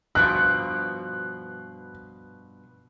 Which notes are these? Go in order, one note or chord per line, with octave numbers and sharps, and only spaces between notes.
G2 B2 F3 F#6